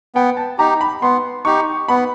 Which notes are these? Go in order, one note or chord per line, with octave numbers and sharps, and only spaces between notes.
B3 G5
A5
D#4 G4 A#5
B5
B3 C6
D#4 G4 C#6
B3 B5